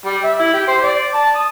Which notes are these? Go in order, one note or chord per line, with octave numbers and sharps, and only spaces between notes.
G3
E5
E4
G4
C5
D5
A5
D#6